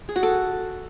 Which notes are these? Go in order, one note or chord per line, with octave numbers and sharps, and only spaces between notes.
G#4
F#4
A4